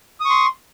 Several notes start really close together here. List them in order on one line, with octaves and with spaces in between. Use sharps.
D#6 C#6 C6